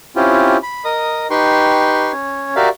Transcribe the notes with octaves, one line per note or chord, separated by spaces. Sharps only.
C4 C#4 E4 F4 G4
B5
A#4 D#5 D#6
D#4 G4 B4 G5 C6 C#6
C#4 C#5
F#4 G4 A#4 D5 E5 F5